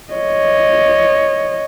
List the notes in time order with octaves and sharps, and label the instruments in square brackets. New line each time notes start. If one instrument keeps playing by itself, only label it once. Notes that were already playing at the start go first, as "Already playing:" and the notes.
[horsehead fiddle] C#5 D#5